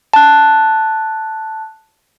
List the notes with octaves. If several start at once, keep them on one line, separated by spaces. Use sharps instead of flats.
A5 F#6